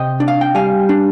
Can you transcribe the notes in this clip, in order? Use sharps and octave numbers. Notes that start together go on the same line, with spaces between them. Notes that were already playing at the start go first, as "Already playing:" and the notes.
Already playing: C3 D#5 G5
D4
F5
G5
G3 F5 G#5
D4